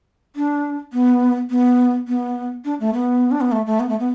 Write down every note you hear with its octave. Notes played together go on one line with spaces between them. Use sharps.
D4
B3
B3
B3
D4
A3
B3
D4
B3
A3
A3
B3
A3
B3